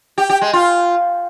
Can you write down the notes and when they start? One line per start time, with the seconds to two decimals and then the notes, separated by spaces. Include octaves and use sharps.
0.18 G4
0.30 G4
0.41 G#3
0.53 F4